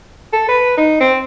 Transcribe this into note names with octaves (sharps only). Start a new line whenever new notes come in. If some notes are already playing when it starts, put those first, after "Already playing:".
A4
B4
D#4
C4